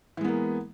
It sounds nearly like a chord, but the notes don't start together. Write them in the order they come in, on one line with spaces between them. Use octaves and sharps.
E3 G#3 B3 A#3